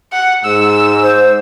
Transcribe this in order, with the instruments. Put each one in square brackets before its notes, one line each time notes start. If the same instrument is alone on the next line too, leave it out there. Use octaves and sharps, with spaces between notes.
[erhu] F#5
[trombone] G#2 [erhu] E6
[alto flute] C5